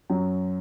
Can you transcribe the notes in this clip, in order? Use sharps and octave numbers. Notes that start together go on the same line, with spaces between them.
F#2 F#3